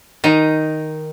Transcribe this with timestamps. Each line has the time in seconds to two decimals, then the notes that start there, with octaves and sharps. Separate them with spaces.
0.24 D#3 D#4